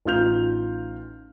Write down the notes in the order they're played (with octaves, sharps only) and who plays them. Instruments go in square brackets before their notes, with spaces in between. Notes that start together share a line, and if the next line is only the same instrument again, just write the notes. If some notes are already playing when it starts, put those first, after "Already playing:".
[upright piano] A1 D#4 F4 F6 G6 F7